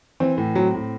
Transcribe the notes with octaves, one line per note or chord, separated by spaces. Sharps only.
E3 C4
A2
F#3 C4
A2